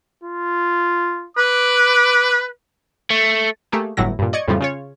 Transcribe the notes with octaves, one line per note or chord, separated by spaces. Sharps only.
F4
B4 D6
A3
A3 A#3 G4 G#4
G1 A2 E3 F#3 E4 A#6
G2 A#2
D5 D#5 C#6 G#6 C#7
F2 A2 C#3 F3 G3
C#3 F4 C#5